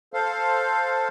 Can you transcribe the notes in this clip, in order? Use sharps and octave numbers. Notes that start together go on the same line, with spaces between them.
A4 C5 F5